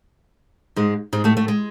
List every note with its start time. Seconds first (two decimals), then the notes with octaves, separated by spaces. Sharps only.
0.76 G#2 G#3
1.13 G#2 G#3
1.24 A2 A3
1.37 A2 A3
1.48 G#3